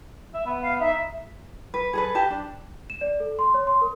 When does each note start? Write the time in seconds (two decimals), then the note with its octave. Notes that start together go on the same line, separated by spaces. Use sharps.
0.34 E5
0.46 B3
0.62 F5
0.81 D#4 E5
1.74 B4
1.93 G#4 A4 B4
2.15 F#4 G4 A5
2.30 D4
2.90 E7
3.01 D5
3.20 A4
3.39 C6
3.54 C#5
3.67 C6
3.81 A#4